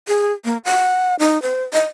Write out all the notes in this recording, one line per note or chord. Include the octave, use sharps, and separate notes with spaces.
G#4
A#3
F#5
D#4
C5
D#5